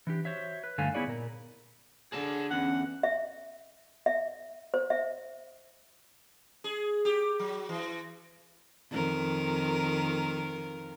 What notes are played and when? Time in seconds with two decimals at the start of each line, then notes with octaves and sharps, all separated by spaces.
0.07 E3 D4 G4
0.25 F#4 C5 C#5 E5
0.64 B4
0.78 G2 D3 A3 A4 F5 G#5
0.94 B3 E4 G#4 C#5 D5
1.07 A#2 A#4
2.12 D3 G#4 A5
2.51 E2 C#4 F#5
3.03 E5
4.06 E5
4.74 C5
4.90 E5
6.64 G#4
7.05 G4
7.39 F#3
7.69 E3
8.91 F2 D#3 A#4